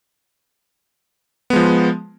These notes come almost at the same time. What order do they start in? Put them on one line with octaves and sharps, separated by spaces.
B3 G#3 F3